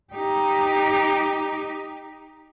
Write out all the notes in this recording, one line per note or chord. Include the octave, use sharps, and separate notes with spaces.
D#4 G4